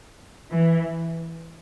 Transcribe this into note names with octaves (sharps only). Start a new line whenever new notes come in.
E3